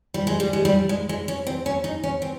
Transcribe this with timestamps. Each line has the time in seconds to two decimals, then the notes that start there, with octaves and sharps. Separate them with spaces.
0.14 G3
0.27 G#3
0.40 G3
0.53 G#3
0.65 G3
0.89 G#3
1.09 G#3
1.28 C#4
1.47 C4
1.66 C#4
1.84 D#4
2.03 C#4
2.22 C4